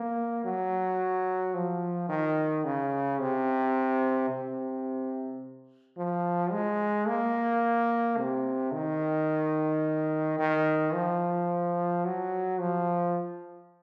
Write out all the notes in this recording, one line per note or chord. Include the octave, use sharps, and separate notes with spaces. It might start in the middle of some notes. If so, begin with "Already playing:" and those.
Already playing: A#3
F#3
F3
D#3
C#3
C3
C3
F3
G#3
A#3
C3
D#3
D#3
F3
F#3
F3